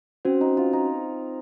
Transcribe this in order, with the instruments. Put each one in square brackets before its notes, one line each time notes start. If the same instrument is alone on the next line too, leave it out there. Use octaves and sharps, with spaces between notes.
[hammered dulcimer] C4 [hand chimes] C#4 F#4 C5
[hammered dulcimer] D#4
F4
D#4